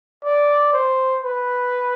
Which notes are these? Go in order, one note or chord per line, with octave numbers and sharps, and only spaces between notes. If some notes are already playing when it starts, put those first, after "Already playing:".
D5
C5
B4